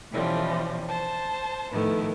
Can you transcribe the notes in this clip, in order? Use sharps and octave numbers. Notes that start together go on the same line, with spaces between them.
B2 E3 F3 G3 C#4
C5 A5
A2 D#3 F3 A3 B3 E4